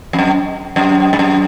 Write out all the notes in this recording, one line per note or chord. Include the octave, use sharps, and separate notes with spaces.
F2
F#2
F#2
G2
F#2